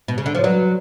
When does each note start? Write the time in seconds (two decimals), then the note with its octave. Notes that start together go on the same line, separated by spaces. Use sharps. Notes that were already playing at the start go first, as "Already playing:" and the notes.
0.08 B2
0.18 C#3
0.26 D3
0.35 F3 C#5
0.43 F#3 B4 D5